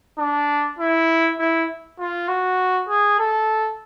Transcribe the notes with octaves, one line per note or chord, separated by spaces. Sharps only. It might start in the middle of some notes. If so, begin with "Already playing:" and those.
D4
E4
E4
F4
F#4
G#4
A4